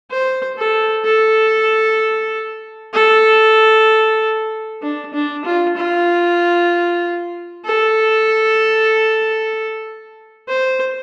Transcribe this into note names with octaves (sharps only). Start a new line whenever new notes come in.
C5
A4
A4
A4
D4
D4
F4
F4
A4
C5